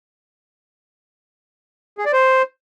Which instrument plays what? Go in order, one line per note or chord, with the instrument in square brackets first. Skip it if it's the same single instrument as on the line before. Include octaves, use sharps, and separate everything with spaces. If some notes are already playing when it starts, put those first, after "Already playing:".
[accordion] G#4
D5
C5